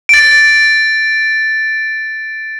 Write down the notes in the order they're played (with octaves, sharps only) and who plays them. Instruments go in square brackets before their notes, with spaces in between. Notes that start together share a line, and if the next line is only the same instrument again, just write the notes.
[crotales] A6 D7